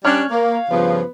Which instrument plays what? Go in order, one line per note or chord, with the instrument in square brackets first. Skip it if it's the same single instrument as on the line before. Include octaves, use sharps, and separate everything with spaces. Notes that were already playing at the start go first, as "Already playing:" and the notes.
[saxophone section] G3 D4 [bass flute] C#4 [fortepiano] C#5 F6 F#6
[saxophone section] A#3 [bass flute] F5
[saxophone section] G2 C#3 F3 [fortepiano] B3